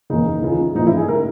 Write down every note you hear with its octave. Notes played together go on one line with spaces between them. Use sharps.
E1 D#2 C#3 D#4
C#2 C#3 E3
A#1 G#2 E3 D#4
E4
G#4
C#3 G#3 A#4